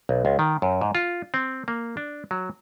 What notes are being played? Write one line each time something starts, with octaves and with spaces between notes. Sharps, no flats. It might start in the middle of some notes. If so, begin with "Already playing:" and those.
B1
C#2
D#3
F#2
G#2
F4
C4
A#3
D4
F#3